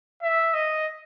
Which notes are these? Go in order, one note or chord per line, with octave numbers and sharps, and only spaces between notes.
E5
D#5